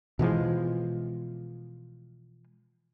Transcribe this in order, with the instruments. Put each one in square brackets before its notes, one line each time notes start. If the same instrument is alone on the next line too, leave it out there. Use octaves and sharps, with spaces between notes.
[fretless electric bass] B2 E3 F3 G#3